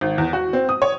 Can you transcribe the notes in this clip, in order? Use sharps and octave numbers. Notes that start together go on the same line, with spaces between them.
G#1
E2
F#4
C4
D#6
C#5